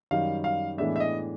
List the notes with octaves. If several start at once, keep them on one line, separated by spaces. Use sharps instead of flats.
F#2 D#3 G3 F5
F5
A2 E3 G#3 B3 D4 E5
E5
D#5